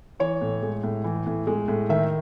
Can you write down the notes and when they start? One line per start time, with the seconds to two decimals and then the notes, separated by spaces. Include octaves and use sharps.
0.20 E3 C#5
0.41 A2
0.63 G#3
0.83 A2
1.04 E3
1.27 A2
1.47 G#3
1.68 A2
1.89 D#3 E5